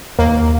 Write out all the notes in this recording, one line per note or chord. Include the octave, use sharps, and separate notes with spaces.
D#2 A#3